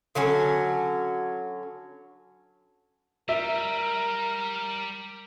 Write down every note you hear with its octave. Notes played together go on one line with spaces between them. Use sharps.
D3 F#3 C#4
G3 A#4 E5